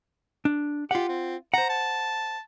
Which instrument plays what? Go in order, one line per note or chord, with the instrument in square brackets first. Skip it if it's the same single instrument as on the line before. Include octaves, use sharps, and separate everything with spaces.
[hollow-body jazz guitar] D4
[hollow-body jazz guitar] F4 F#5 [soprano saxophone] G4
[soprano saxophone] C4
[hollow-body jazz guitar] C5 F#5 [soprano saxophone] A#5
[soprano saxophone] A5